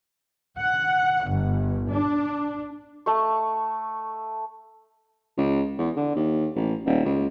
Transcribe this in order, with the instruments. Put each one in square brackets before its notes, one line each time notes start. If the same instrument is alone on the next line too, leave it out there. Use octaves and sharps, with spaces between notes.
[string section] F#5
G1
D4
[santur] A3 C#6
[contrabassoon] C#2
E2
D3
D#2
A1
D#1
C#2